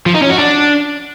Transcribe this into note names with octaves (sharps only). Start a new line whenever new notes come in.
F3
D#4
C#4
F#4
D4